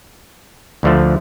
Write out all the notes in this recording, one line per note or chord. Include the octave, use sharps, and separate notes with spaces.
D2 D3 F3 A3